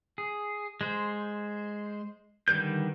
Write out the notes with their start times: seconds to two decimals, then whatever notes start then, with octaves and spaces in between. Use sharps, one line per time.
0.18 G#4
0.81 G#3 C5
2.48 D3 D#3 G3 B4 G6